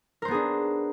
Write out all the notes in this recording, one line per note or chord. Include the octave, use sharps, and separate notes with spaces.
B3 D4 G#4 A#4 C5